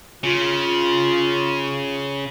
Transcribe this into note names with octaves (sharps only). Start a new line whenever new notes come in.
C#3 F4